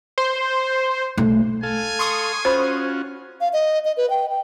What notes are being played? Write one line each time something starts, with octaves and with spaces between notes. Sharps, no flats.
C5
B1 A3
A4 F5 G#5
C6 C#6 D#6
C#4 F4 F#4 C5 B5
F5
D#5
D#5
B4
G5
G5